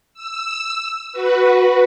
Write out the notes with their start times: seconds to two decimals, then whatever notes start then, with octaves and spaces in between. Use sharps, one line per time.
0.14 E6
1.12 F#4 B4